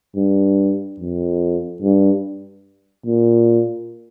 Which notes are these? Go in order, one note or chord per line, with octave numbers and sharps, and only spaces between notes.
G2
F2
G2
A#2